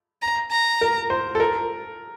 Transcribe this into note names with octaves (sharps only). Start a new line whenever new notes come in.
A#5
A#5
A#4
C5
A4
A#4